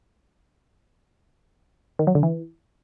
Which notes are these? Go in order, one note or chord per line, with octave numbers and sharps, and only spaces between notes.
D#3
F#3
D3
E3